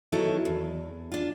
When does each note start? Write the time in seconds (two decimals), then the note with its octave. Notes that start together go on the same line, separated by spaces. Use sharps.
0.12 D#3 F#3 B3 E4 A4
0.45 E2
1.12 D4 F4